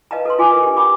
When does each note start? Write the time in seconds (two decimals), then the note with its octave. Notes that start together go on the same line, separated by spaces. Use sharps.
0.11 B4 D#5 F5 A5 A#5
0.25 A4 B4 C6
0.39 E4 F4 G#5 D6
0.51 A#4 B4 D#5
0.63 D4 G4
0.77 G5 B5 D6